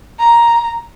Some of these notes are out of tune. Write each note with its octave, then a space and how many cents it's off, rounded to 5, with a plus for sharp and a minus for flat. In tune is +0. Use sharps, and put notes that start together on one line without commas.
A#5 +10